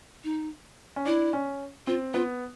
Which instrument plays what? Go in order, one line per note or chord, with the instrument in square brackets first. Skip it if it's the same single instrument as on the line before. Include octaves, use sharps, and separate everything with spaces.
[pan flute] D#4
[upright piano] C#4
[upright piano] D4 [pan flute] E4
[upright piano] C#4
[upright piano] C4 [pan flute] F4
[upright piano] B3 [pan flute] F4